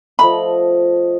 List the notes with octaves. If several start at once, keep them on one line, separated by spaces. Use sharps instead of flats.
F3 A3 D#5 B5